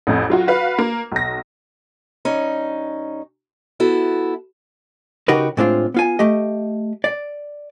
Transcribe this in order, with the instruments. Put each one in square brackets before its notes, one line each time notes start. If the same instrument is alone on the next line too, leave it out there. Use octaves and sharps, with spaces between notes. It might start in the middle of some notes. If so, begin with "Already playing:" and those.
[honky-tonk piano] A1 F2 A2
F#3 F4 F#4
F#4 B4 F5
A#3
B1 A#6
[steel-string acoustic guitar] G2 C#4 D#4
B3 E4 F#4 A4
[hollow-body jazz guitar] C#3 D#4 F#4 G4 A#4 B4
A2 G#3 C4 D4 D#4 F4
B3 F4 G#5
A3 G4 D#5
D5